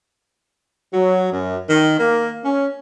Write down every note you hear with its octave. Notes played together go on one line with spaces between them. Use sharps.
F#3
F#2
D#3
A#3
C#4